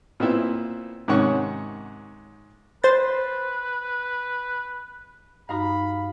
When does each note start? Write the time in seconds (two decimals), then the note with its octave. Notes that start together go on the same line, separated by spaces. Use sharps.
0.20 A#2 B3 C4 E4
1.08 G#2 C3 D#3 C#4 F#5 C#6
2.84 B4 C5 A6
5.49 G2 D#4 F#4 F5 A#5 B5